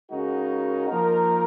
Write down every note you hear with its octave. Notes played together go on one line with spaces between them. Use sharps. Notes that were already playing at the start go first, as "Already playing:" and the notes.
C#3 G#3 D#4 F#4 A#4
F3 A#3 D#4 A#4